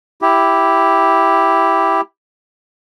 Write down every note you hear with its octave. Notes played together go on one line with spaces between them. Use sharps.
E4 G4